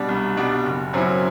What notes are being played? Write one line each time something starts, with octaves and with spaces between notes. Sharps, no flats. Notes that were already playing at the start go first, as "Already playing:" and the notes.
Already playing: B2 G3 D4
C2
B2 G3 D4
F#1
F#2 F#3 C4 E4